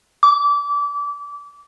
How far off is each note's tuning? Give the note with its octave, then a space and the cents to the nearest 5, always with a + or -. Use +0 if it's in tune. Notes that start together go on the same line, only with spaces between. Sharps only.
D6 -25